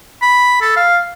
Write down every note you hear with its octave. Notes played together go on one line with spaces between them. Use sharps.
B5
A4
F5